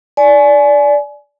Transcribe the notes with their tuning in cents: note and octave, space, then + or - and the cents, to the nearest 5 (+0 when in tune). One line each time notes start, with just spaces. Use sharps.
D5 -15 G#5 +25